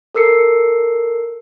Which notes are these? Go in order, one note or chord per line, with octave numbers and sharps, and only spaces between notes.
A4 A#4 E6 C7 C#7